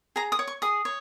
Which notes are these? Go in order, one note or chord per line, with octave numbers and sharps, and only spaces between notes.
G#4 A#5
D#6
C#5
C#6
G#4 D#6
C#5